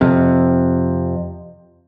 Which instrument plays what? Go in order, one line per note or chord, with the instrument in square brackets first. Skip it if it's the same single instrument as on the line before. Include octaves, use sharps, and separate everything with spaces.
[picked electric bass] F2 C3